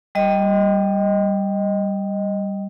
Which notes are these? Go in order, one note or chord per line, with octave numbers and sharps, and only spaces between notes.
G3 D#5